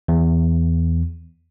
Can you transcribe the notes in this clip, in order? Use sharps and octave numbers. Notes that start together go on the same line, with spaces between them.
E2